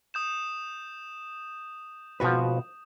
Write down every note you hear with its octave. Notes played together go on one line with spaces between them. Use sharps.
D#6 G6 E7
G#1 B2 F3 F#4 B4